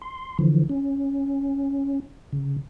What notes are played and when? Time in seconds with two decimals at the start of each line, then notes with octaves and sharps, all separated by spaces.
0.02 C6
0.39 D3 E3 F3
0.69 C#4
2.33 C#3